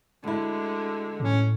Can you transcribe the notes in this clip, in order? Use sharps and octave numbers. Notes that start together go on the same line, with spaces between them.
D2 D3 G#3 E4
A2 C#4